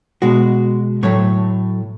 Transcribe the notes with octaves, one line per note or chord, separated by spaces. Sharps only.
B2 G#3 F#4
A2 F#3 A3 C#5